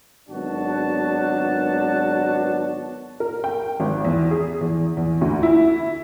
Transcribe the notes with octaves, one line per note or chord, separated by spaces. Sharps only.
G#1 F#3 B3 D4 F#4 A5
A#4
G5
G#1
E2
G#4
E2
E2
D2
E4